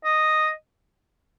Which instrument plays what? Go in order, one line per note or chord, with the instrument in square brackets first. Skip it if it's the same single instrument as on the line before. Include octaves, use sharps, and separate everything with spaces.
[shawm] D#5